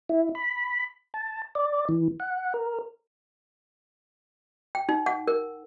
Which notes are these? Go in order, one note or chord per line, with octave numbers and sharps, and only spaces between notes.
E4
B5
A5
D5
E3
F#5
A#4
G5
D#4
F#5
A#4